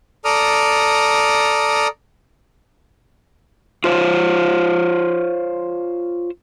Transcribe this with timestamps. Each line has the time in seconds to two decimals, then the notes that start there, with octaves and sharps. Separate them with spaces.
0.25 A4 D5 A#5 D#6 F6
3.84 F4 C5 C#5